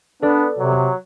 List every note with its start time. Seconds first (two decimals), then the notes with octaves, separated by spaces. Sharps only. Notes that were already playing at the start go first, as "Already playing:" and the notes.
0.23 B3 D4 A4 B4 D5
0.58 C3 F#3